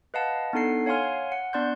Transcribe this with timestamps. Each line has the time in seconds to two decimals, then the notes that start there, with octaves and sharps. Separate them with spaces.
0.14 B4 D#5 F5 F#5 A5
0.53 B3 D4 D#4 A4 F#5 C7
0.86 C#5 F5 F#5 G#5 C6 F6
1.32 F#5
1.53 B3 D4 D5 C6 F#6 G6